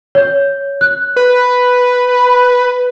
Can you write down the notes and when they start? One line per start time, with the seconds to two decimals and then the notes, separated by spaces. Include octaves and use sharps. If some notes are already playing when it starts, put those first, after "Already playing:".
0.15 C#5 G6
0.81 F#6
1.16 B4